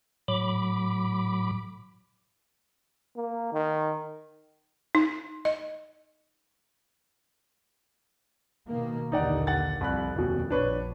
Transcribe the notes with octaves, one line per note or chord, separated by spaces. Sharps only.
A2 F#3 B5 D6
A#3
D#3
D#4
D#5
B2 D#3 A#3
A#1 D#2 D3 D#4 D5 F#5
F#5 A6
C2 F2 B5 F#6
D#1 B2
A#1 D4 B4 C#5